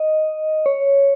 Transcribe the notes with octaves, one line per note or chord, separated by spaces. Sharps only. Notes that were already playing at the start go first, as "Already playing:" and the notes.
Already playing: D#5
C#5